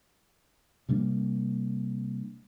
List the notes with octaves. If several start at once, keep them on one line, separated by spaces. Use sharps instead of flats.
C3 G3 A#3 D4